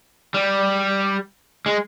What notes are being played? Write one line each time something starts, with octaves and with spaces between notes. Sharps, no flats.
G3
G#3